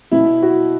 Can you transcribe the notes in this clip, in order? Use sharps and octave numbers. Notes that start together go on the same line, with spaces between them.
B2 E4
F#4